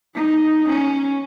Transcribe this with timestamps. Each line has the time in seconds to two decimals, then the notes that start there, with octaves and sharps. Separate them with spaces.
0.15 D#4
0.69 C#4